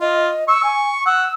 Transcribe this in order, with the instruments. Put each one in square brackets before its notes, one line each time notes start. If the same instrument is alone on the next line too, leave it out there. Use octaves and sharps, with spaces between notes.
[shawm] F4 [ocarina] D#5
[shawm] C#6 [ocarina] E6
[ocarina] G#5
[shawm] F#5 [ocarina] E6